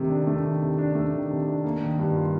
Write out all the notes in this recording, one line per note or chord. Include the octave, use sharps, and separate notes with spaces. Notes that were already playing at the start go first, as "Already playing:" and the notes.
Already playing: C3 D#3 A3
D4
A3
D#3
C3
D4
A3
D#3
C3
D4
A#3
D#3
G2
F4